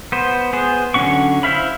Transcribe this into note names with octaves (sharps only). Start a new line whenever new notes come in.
B3 C5
B3 G#4 C5
D3 F#3 C#4 F#5 C#6
E4 C5 E5 F5 B5